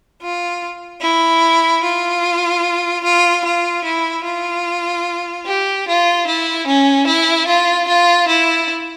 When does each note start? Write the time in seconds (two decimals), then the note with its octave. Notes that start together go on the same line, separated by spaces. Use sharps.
0.22 F4
1.02 E4
1.83 F4
3.04 F4
3.44 F4
3.84 E4
4.24 F4
5.45 G4
5.87 F4
6.26 E4
6.66 C#4
7.06 E4
7.47 F4
7.87 F4
8.28 E4